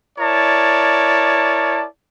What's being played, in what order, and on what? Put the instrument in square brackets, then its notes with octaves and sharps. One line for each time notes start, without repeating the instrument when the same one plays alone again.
[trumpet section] E4 A#4 C#5 D5 A5